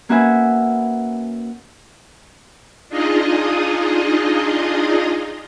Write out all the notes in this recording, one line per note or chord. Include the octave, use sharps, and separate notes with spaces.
A#3 C#4 F#4 B4 E5 G#5
D4 D#4 F4 G#4 D#5